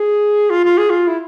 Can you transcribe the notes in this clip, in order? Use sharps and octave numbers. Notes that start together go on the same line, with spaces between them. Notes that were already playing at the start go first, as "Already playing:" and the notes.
Already playing: G#4
F4
F4
G#4
F4
E4